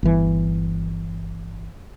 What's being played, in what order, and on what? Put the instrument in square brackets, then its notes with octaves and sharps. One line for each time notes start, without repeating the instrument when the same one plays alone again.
[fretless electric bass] G1 E3